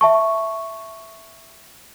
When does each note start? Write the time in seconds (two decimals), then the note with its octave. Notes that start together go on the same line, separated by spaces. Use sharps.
0.01 E5 A5 C#6